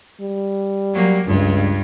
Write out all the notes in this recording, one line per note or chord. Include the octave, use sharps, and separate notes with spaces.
G3
F#3 A#3
C#2 G2